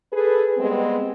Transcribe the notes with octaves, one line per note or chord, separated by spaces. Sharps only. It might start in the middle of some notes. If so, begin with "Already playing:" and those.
G#4 A4 B4
G3 G#3 B3 C4